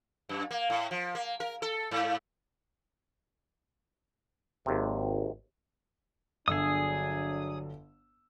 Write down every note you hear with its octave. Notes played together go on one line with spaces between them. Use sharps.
F#2
A#3
A2
F3
A#3
A#4
A4
G#2
G#1 D#2 C3
G1 D3 F#3 D4 G#4 D#6 E6